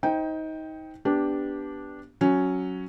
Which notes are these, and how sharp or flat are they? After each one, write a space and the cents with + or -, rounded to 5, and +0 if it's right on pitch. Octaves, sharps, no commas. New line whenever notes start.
D#4 +25 C5 +0 G5 +0
B3 +0 D4 -10 G4 +0
F#3 +0 C#4 +0